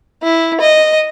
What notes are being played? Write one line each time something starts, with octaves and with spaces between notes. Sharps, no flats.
E4
D#5